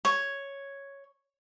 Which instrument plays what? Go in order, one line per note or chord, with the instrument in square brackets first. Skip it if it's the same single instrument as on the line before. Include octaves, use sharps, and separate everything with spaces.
[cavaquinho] C#5